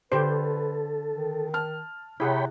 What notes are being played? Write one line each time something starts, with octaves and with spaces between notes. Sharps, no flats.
D3 G4 A4 B4 C5
D#3
A5 F6
C3 E4 G#4 C#5 F#5 G5 B5